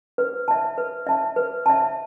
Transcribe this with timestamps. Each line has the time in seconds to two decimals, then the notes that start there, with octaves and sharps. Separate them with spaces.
0.18 B4
0.48 E5 A5
0.78 B4
1.07 E5 A5
1.36 B4
1.66 E5 A5